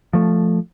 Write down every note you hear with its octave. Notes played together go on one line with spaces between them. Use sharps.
F3 A3